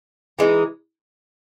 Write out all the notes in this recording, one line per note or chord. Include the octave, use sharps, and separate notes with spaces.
E3 G#3 D#4